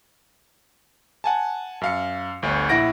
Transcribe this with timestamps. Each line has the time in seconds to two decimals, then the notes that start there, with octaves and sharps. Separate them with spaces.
1.24 F#5 G#5 A5
1.81 F#2 F5 C#7
2.42 G1 D2 C#5
2.69 A#1 E4 F#5 A#6 D7